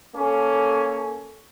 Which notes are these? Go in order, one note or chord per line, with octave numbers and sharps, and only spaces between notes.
A#3 C#4 A4